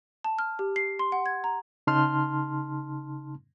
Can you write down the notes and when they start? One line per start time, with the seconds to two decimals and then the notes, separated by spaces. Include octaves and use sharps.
0.24 A5
0.39 F6
0.59 G4
0.76 C7
0.99 C6
1.12 F#5
1.26 G#6
1.44 A#5
1.87 C#3 D#4 A5 C6 F6